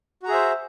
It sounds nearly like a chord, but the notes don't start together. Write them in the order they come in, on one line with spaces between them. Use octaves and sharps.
F#4 A#5 G#4 E5 C5